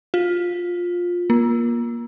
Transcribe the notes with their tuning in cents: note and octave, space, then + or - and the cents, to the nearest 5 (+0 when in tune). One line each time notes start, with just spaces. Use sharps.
F4 +15
A#3 +25